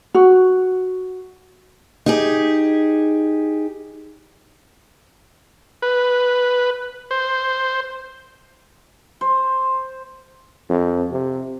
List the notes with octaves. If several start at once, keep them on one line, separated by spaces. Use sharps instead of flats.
F#4
D#4 G4 G#4
B4
C5
C5
F2
C3